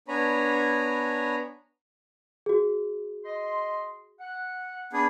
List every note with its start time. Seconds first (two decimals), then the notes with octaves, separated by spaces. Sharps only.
0.08 B3 D4 C#5 G#5 A#5 B5
2.46 F#4 G#4
3.25 D#5 C6
4.20 F#5
4.93 B3 D4 G#4